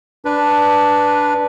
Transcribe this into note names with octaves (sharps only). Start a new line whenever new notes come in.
D4 B4